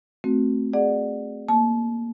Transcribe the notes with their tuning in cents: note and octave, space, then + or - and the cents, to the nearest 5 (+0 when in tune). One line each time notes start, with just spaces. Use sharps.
A3 +0 C4 +0 F#4 +0
G#4 -15 D5 +20 F#5 +0
A#3 +0 A5 -30